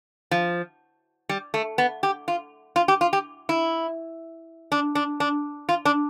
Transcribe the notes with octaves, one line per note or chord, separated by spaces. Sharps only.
F3
G3
A3
B3
G4
F4
F4
G4
F4
G4
E4
D4
D4
D4
F4
D4